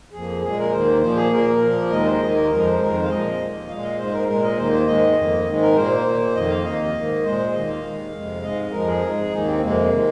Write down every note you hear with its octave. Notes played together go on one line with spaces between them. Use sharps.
F2 F3 A#3 G#4
A#2 G#3 G#4
A#4
D#2 D#3 A#3 C5
A#2 F3 A#3 C5
G#4
A#2 A#3 A#4
A#2 F3 A#3
D#2 D#3 G#3 D#5
C5
D#2 D#3 A#3 D#5
A#4
F2 F3 G#3 A#4
C5
F2 D#3 G#3 A#4
C5
F5
A#2 F3 G#3 D#5
D#2 D#3 A#3
A#2 G#3 F5
D#5
G#2 G#3 C5
A#4
A#2 G#3 A#4
D#5
D#2 D#3 A#3 C5
C5
G#2 D#3 G#3 D#5
F2 D#3 A#3
G#2 D#3 G#3
A#4
A#2 A#3 C5
A#2 A#3
F2 D#3 A#3 D#5
F5
D#2 D#3 A#3 D#5
G#2 D#3 A#3
A#2 G#3 C5
D#2 D#3 A#3 D#5
F5
D#2 D#3 G#3
F2 C3 G#3
G#2 G#3 D#5
F2 F3 G#3 A#4
G#4
G#2 G#3
D#2 D#3 A#3 D#4
C4
F2 C3 G#3 A#3
D#3 G#3